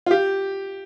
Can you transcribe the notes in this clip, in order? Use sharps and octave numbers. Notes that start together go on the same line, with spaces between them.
F4
G4